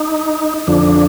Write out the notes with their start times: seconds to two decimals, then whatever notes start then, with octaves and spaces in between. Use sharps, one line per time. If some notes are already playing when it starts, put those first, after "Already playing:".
Already playing: D#4
0.67 F2 D3 F3 D4